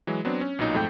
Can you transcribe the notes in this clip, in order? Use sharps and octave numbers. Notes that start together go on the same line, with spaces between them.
E3 F#3 G#3
F#3 B3 C4 D4
C#4
B1 A#2 F#3 D#4
F2 G#2 A3 G5 G6